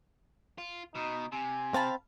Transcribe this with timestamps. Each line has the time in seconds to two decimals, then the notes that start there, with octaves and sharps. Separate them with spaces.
0.58 F4
0.95 B2 D#4
1.32 C3 G#5
1.74 C4 F5 A5 B5